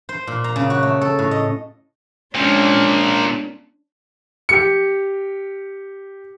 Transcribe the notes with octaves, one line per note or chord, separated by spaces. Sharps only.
C5
A#2
A#5
C#3
F#4
A3
A4
A2
D#5
A#2 F3 G#3 C#4 D4
G4 C#7